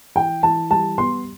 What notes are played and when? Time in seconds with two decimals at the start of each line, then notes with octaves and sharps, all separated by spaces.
0.15 E3 G5
0.43 E3 A5
0.70 G3 A5
0.98 B3 C6